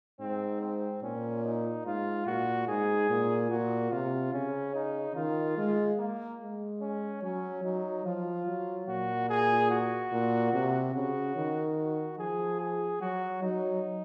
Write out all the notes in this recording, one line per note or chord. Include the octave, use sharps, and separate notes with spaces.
G#2 C4
C4
A#2 C#4
D#4
G#2 F4
A#2 F#4
G#2 G#4
A#2
A#2 F#4
C3 F4
C#3 C#4
D#4
D#3 F4
G#3
A#3
G#3
C#4
F#3 C#4
F#3 D#4
F3 F4
F#3
A#2 F#4
G#4
F#4
A#2
C3
C#3 F#4
D#3
F#4
F3 G#4
G#4
F#3 F#4
F#3 D#4